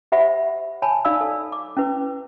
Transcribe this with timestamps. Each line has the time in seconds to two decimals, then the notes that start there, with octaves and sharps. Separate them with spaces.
0.12 G4 C5 E5 F#5 B5
0.82 C#5 G#5 A5 B5
1.05 D#4 D5 F5 B5 E6
1.21 A4
1.52 D6
1.77 C#4 E4 B4